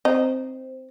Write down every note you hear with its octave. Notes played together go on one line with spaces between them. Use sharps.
C4 D#4